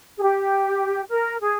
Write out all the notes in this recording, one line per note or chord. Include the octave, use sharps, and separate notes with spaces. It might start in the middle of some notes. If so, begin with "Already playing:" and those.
G#4
G4
A#4
G#4